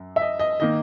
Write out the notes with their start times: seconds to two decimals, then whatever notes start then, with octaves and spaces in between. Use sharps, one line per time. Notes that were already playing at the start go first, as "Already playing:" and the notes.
Already playing: F#2
0.16 E5
0.22 D#5
0.39 D#5
0.60 D#3 A#3 D#5